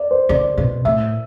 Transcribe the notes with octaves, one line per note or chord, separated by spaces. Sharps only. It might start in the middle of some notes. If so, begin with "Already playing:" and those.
Already playing: D5
C5
D3 D5
B2
A2 E5